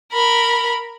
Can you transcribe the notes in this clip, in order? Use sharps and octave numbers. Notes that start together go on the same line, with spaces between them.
A#4 B5